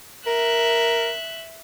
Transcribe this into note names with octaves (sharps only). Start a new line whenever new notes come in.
A#4 E5 F#6